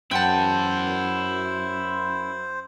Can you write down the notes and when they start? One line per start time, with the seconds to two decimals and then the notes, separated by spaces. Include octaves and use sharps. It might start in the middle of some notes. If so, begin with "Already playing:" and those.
0.11 F#2 E4 C5 F#5 G5 A5